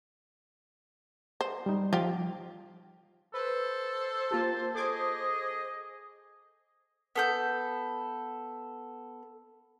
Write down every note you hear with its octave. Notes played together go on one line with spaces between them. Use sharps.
C5
G3 D#4
F3 F4 G4
A4 B4 C5
A#3 F4 G4 A5
G#4 A4 D#5 D6 G#6
B3 A4 G6